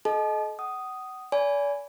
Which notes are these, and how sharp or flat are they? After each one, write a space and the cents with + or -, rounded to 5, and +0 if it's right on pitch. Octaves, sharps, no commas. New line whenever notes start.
A4 -40 D#5 +0 A5 -40
F#5 +30 D#6 +0
D5 -40 G#5 +0 B5 +0